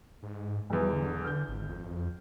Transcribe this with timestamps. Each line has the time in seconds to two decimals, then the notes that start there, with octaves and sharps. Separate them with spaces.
0.23 G#2
0.70 B1 E2 G3
0.93 D3
1.24 F6 G6
1.48 G#1
1.69 F2